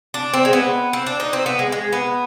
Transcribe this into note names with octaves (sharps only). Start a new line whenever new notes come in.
D4
C4
G#3
B3
C4
D4
D#4
C4
B3
G#3
G#3
B3